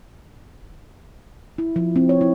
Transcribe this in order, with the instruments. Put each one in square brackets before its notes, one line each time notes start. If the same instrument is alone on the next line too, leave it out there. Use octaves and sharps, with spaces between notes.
[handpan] E4
F3
C4
C#5
E4